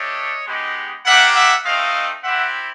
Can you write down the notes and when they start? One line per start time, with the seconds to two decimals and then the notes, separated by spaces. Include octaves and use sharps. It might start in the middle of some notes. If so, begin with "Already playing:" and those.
Already playing: A3 D4 G4 C#5 D#5
0.45 G#3 B3 D#4 G4
1.04 A#3 D4 G4 E5 F#5
1.34 E5 F#5
1.64 A3 C4 D#4 D#5 F5
2.23 C4 E4 G4 E5 F#5